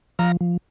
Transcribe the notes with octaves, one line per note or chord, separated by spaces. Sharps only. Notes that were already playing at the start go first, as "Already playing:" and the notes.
F3 F5 A#5
F3